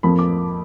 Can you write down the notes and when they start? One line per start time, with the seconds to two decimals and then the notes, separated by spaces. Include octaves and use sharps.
0.03 F2 F3 A#3 B5
0.19 D6